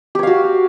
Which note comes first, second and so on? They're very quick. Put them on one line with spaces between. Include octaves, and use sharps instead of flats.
G4 C#5 F5 F#4